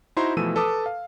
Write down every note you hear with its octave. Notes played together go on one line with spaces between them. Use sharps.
D#4 E4 F#4 C5 A#5 C6
B2 E3 F3 A3 E6 D#7
A4 B4 A5 D6 D#6
F5